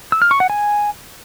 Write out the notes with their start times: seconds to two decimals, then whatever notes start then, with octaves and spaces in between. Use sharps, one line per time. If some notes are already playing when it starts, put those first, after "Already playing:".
0.12 E6
0.22 F6
0.31 C#6
0.40 F#5
0.50 G#5